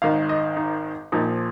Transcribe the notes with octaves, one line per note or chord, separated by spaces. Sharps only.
G#1 G#2 D#3 F5
D#5
D#4
A#1 A#2 F3 D#4